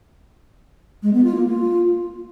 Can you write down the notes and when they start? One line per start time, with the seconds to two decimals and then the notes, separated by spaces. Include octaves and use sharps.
1.03 G#3
1.13 B3
1.24 F4
1.35 A#3
1.45 F4